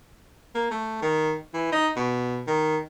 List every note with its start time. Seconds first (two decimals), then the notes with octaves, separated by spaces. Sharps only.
0.55 A#3
0.71 A3
1.02 D#3
1.54 E3
1.72 D#4
1.96 B2
2.47 D#3